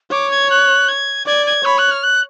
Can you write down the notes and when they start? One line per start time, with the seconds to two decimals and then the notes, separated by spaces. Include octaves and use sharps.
0.11 C#5 D6
0.30 G#6
0.50 F#6
0.88 G#6
1.26 D5 G#6
1.46 G#6
1.64 C#5 B5
1.78 F#6
1.91 F6
2.03 F#6